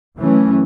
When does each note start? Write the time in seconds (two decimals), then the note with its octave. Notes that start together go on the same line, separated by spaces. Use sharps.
0.19 F#2 E3 A3 C#4